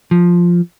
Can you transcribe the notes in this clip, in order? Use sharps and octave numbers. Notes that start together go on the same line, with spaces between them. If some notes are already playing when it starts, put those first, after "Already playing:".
F3